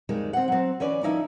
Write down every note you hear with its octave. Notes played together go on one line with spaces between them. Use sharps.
F2 D#3 G3 G#3
C4 F#5
F#3 C4
E3 C#4 B4 D5
D#3 F3 D#4 E4